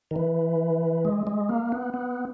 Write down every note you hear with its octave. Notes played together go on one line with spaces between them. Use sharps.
D#3
E3
G#3
G#3
A#3
B3
B3